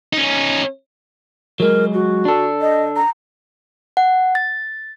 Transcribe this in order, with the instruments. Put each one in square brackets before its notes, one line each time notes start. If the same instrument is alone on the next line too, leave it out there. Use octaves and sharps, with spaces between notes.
[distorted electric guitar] C#4 D#4
[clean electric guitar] F#3 G#3 [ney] A#4
[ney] F#4
[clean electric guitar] D4 A4
[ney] D#5
A#5
[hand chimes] F#5
A6